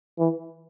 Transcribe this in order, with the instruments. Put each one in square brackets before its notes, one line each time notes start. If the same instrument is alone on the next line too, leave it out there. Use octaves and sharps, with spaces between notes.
[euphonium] E3